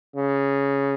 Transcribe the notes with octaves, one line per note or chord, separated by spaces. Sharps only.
C#3